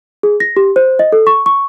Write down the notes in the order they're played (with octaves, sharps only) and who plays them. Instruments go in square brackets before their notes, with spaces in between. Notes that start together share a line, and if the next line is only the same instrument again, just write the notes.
[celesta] G#4
A#6
G4
C5
D#5
A4
C#6
C#6